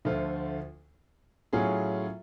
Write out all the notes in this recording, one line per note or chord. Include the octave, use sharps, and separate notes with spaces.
D2 D3 F3 A3 F4
A2 F#3 C#4 F4 G#4